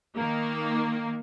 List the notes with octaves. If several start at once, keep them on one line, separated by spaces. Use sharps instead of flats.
D#3 A#3